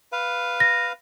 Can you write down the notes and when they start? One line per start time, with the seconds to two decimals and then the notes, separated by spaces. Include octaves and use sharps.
0.12 B4 F5
0.60 A#6